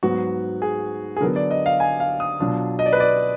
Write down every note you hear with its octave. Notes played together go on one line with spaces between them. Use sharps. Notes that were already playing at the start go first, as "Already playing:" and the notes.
G#2 F#3 B3 F#4
G#4
G#4
D3 F#3 B3 A#4
D5
D#5
F5
G#5
F5
D#6
B2 F#3 D4 F4
D#5
D5
B4
D5